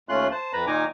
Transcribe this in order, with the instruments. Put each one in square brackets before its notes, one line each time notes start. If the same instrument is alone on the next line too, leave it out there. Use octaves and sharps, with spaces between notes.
[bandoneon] D#2 A3 C#4 F4 C6 F#6
C5 A5
F2 B4 A#5 B5
A#2 D#3 D#4 G#5 A#5 D6